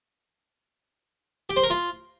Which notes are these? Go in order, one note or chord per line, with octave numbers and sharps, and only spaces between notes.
G4
C5
A#4
F4